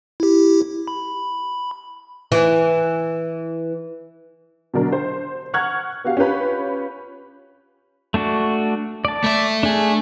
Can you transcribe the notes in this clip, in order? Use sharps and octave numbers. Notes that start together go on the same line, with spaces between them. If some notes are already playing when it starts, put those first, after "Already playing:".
E4 G4
B5
E3
B2 D3 F#3 D4 A#4
C5
F#5 C#6 F6 F#6 G#6
B3 F#4 G4 F5
C#4 F4 G4 B4 B5
A3 D4 F#4
D5 A5
A3 E5
D4 G#4